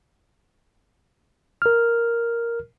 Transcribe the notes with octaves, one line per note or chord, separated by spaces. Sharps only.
A#4 F6